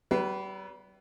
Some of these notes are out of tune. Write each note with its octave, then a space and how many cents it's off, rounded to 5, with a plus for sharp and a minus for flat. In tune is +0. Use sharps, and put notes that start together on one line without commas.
G3 -40 B4 +0